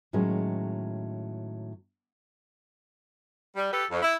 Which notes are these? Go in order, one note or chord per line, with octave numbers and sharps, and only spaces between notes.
A2 D#3 F#3 G#3 C#4
G3
G4 A4 B4
F2
E4